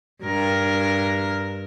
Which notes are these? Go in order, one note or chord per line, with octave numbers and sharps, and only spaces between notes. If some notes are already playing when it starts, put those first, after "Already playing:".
G2 A#4